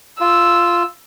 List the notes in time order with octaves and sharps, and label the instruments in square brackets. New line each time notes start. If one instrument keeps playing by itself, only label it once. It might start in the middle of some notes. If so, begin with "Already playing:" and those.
[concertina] F4 [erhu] E6